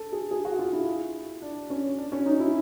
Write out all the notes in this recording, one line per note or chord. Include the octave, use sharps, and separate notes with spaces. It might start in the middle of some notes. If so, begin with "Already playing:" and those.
Already playing: A4
G#4
G#4
F#4
F4
E4
D4
C#4
D4
C#4
D#4
E4